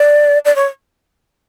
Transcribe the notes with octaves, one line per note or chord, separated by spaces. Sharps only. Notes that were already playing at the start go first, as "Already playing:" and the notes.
Already playing: D5
D5
C#5